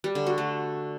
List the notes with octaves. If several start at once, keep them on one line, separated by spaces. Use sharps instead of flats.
G3
D3
F#4
A3